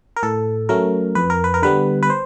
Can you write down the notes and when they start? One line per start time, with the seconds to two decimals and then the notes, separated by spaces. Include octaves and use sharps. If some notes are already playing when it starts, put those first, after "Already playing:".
0.17 A#4
0.23 A2 A4
0.69 F#3 A3 C#4 A#4
1.15 F2 B4
1.30 A#4
1.44 B4
1.54 A#4
1.63 D3 G3 B3 B4
2.03 B4
2.10 C5